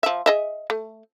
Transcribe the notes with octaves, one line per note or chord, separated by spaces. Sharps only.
F3 E5
G#4 D#5 E5
A3